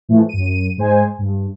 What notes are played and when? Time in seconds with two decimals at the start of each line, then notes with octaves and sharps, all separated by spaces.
0.09 A2 E3 F3 A3
0.29 F#2 D#7
0.77 G#2 G#3 C5 G#5
1.18 G2